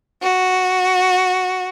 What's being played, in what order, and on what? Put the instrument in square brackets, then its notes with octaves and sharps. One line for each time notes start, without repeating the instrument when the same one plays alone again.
[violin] F#4